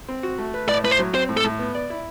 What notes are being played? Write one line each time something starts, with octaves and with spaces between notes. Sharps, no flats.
C4
F#4
A3
B4
A2 D5
A2 B4
C5
F#3
C4 C5
A2
A4
A2
B3
D5
E4